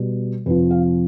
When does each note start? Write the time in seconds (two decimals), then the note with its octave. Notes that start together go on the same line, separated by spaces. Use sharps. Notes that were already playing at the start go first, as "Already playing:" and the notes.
Already playing: B2 G3
0.46 F2 C3 F3 B4
0.71 F5